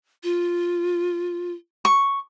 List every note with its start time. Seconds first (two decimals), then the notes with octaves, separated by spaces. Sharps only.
0.24 F4
1.85 C#6